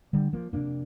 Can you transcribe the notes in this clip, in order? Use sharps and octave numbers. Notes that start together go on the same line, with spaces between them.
D3 G3
F3 A#3
F2 C3 A#3 D4